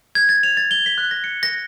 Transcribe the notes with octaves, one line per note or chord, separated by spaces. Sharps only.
G#6
A6
F7
A6
G7
B6
F#6
A#6
C#7
A#6